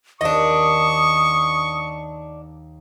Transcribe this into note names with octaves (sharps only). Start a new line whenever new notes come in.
D#2 D4 D#5 C#6 D#6